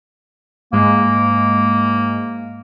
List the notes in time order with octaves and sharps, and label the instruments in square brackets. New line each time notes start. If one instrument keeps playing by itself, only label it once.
[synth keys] G#2 G#3 [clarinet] A#3